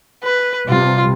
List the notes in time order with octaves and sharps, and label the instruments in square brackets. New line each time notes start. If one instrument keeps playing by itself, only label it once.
[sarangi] B4
[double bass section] C3 G3 [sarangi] F4